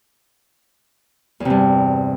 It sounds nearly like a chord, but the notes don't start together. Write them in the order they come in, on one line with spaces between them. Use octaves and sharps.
E2 C3 G2